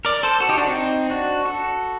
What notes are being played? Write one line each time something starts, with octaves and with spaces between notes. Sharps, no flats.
A#4 D5
A4 C5
F#4 A4
D#4 G4
D4 F#4
C4 D#4
D4 F#4
F#4 A4